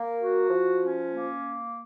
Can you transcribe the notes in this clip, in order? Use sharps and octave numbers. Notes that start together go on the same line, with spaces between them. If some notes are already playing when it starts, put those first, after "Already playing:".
Already playing: A#3
F#4
F3
C#4
A#3